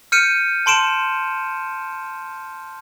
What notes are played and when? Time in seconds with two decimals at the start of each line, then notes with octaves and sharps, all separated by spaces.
0.12 F6 G6 C#7 D#7
0.66 A5 C6 D7 E7